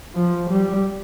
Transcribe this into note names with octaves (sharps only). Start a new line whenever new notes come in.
F3
G3